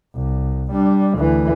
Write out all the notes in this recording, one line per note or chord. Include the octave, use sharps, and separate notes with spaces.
C2
G3 D4
D2 E3